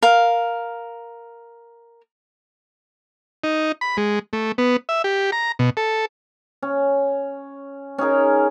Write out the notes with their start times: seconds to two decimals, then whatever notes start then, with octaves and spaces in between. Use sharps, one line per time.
0.03 A#4 F5
3.44 D#4
3.81 B5
3.97 G#3
4.33 A3
4.58 B3
4.89 E5
5.04 G4
5.32 A#5
5.59 B2
5.77 A4
6.62 C#4
7.98 C#4 D#4 G#4 A#4